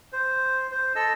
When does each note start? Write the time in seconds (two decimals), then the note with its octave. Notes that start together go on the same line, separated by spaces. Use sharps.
0.13 C5
0.71 C5
0.96 A4 D#5 E6